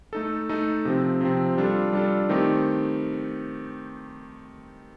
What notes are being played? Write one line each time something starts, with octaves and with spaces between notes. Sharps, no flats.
A3 D#4 A4
A3 D#4 A4
C3 F3 C4
C3 F3 C4
G3 D4 F4 A4
G3 D4 F4 A4
D#3 A3 C4 D#4 G4